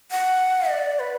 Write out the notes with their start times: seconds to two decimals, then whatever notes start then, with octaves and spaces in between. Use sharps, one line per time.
0.11 F#5
0.70 D5
0.99 B4